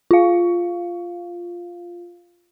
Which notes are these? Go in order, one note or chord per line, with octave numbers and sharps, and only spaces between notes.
F4 F5